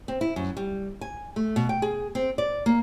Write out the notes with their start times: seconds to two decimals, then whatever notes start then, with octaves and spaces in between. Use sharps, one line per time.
0.08 C4
0.21 E4
0.36 F#2
0.57 G3
1.01 G#5
1.36 A3
1.56 B2
1.69 G5
1.82 G#4
2.15 C4
2.38 D5
2.66 A#3